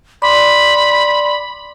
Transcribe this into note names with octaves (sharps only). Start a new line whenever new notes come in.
D5 B5 C6 D6